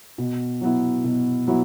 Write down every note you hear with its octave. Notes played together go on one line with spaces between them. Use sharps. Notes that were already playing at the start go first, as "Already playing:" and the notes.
B2
F#3 B3 E4
B2
F#3 B3 E4